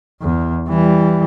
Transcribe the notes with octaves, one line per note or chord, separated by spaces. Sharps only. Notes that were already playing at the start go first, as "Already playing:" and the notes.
E2
E3 G3